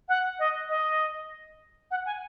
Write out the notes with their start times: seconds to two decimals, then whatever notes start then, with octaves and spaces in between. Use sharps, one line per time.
0.08 F#5
0.39 D#5
0.69 D#5
1.91 F#5
2.06 G#5